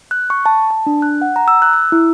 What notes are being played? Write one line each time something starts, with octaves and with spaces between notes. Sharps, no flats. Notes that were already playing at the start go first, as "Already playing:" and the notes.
F#6
C#6
A5
A5
D4
F#6
F#5
A#5
E6
F#6
E6
E4